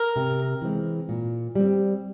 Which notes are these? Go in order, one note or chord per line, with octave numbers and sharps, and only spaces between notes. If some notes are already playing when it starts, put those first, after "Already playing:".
Already playing: A#4
C3
E3 G#3 C4
A#2
G3 C4